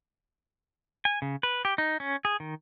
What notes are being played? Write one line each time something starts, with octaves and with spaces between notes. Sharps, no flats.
G#5
C#3
B4
G4
D#4
C#4
G#4
D#3